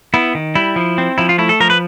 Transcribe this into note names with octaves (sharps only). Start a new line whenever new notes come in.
B3 E4
D#3
G3 E4
F3
C4
F3 E4
F4
A3 E4
A4
F3 A#4
B4